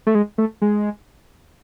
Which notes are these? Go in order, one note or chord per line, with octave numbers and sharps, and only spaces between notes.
A3
G#3
A3
G#3